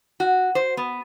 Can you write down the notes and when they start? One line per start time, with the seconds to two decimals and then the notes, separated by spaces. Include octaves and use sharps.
0.20 F#4
0.55 C5
0.77 B3